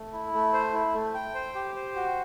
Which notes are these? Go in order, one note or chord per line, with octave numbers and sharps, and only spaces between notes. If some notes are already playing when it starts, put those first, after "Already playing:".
Already playing: A3
E4
A3
C5
E4
A3
G5
C5
G4
C5
F#4